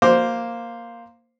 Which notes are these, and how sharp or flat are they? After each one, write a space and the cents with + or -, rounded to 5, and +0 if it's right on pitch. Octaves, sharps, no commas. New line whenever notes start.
A#3 +0 C5 +0 D6 +0